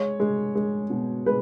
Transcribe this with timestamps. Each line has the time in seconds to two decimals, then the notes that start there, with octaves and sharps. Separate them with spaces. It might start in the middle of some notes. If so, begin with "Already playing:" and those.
Already playing: G#3 C#5
0.20 G#3
0.55 G#3
0.90 B2
1.26 G#3 B4